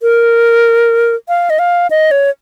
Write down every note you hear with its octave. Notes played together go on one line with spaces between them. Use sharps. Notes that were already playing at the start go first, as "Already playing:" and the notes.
A#4
F5
D#5
F5
D#5
C#5